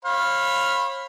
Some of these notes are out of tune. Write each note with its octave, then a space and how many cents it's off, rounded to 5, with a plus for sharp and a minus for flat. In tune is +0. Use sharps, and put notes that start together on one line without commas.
C#5 -40 F5 +0 B5 +0